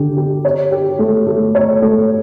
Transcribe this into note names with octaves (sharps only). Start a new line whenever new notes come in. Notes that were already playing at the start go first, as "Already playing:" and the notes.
Already playing: D3 G4
G4
C#5
G4
A3
A3
C#5
A3